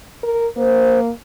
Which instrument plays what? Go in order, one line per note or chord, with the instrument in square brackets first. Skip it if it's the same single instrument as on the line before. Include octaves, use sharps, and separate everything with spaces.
[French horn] A#4
[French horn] A#3 [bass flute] C5